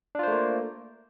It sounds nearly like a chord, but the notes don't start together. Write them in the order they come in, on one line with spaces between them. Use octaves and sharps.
D4 F4 C5 A3 A#3